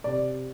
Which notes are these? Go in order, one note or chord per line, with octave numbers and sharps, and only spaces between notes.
C3 D5